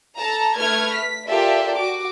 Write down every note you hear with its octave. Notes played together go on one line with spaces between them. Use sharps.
A4 A5 A#5
A3 B4 F6 G#6
B6
F4 G4 A4 A#4 D5 E5
F#4 D6